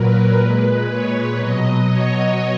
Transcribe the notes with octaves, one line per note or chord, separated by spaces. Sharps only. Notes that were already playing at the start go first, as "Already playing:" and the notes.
Already playing: A#2 F#3 A#4 B4
A#2 G#3
C#5
B2 F#3 D#5
C#5